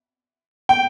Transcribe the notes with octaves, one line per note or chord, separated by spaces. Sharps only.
G5